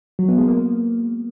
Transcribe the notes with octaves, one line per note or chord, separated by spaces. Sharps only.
F#3
B3
G#3
A#3